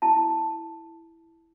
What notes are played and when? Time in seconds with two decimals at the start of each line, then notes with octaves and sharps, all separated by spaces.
0.02 E4 A5